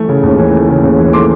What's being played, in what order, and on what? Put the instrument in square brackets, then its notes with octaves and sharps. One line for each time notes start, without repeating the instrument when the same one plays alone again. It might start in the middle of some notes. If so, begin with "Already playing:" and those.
Already playing: [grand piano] E3 A3
C#3
D#2
E3
A3
C#3
D#2
E3
A3 C6 D6